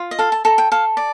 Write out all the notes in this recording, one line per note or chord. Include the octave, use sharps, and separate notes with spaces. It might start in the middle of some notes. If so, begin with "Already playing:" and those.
Already playing: F4
D#5
A4 F5
A5
A4 A#5
G5
A4 F5
D5